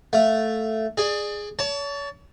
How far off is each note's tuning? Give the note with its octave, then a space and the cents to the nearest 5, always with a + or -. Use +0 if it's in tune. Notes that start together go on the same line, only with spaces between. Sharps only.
A3 +0 F5 +15
G#4 +0 D5 +25
C#5 +35 A5 +0